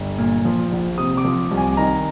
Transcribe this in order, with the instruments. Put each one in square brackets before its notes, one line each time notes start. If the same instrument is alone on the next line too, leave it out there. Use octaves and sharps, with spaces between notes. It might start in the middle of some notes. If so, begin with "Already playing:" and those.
Already playing: [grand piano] G1
A#2
F3
A#1
C3 D#6
D6
F3
C2
G#5
D#3 A#5